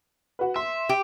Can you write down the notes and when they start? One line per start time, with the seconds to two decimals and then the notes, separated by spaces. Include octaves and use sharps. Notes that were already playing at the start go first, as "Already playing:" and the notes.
0.39 F#4 B4
0.56 E5 C6
0.89 G4